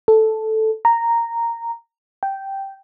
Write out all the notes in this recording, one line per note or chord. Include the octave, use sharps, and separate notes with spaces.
A4
A#5
G5